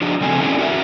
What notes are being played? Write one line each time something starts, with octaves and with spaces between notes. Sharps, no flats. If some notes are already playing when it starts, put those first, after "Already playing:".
F3 D4 D#4 F#4 G#4
C#3 G3 C4 A4 G#5
A3 C#4 E4 F#4 G#4 D5
F#4 G4 A#4 E5